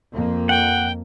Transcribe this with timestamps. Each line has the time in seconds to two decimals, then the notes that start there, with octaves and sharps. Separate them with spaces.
0.11 F2 A#3
0.49 F#5 G5